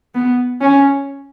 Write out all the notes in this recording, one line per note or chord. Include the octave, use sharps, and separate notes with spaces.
B3
C#4